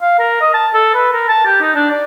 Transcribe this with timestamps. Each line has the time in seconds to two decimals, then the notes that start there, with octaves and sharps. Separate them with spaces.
0.01 F5
0.19 A#4
0.41 D#5
0.54 A5
0.74 A4
0.94 B4
1.13 A#4
1.28 A5
1.46 G4
1.61 D#4
1.75 D4
1.91 D5